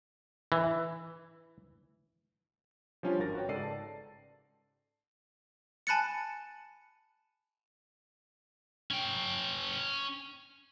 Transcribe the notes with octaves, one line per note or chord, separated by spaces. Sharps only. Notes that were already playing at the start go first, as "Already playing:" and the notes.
E3
F3 G3 C#4 D4 F4
G#1 F#4 A#4 A6 A#6
F#4 B4 C#5 G5
G#2 C#3 A4 D5 C7 D#7
A5
G#5 A5 B5 F#6 A6 C#7
C#4 G5